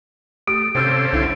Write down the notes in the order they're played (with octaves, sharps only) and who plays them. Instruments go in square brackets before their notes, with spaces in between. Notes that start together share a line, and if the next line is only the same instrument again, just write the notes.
[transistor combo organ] A3 [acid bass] G4 [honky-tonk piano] D#6 [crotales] D7
[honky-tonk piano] G#1 E6 G6 [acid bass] C3 [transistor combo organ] C#4 A4 C5
[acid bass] C2 [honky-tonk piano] D3 E4